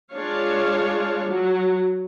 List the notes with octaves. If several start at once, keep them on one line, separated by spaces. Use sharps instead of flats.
G#3 D4 F4 C#5 F5
F#3